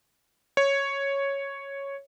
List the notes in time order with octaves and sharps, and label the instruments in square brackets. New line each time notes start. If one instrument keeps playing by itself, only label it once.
[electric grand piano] C#5